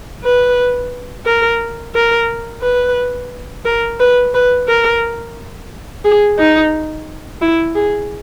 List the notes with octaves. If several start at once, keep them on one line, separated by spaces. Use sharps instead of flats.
B4
A#4
A#4
B4
A#4
B4
B4
A#4
G#4
D#4
E4
G#4